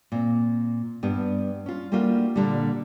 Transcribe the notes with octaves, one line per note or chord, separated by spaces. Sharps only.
A#2 C4
G2 G3 B3
C#4 F4
G3 A3 A#3 D4 F4 F#4
A#2 D3 G3